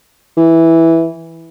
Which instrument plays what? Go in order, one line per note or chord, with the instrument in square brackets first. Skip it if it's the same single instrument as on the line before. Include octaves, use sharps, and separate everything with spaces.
[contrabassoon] E3